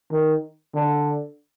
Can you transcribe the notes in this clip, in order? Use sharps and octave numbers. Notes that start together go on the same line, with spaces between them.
D#3
D3